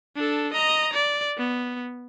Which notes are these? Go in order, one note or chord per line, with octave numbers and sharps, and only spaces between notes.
D4 A4
D#5 A#5
D5
B3